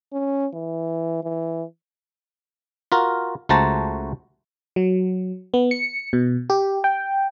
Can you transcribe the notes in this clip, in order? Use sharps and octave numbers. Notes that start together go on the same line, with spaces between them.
C#4
E3
E3
F4 F#4 A#4
C#2 A3 F#4 C5 A5 A#5
F#3
B3
C#7
B2
G4
G5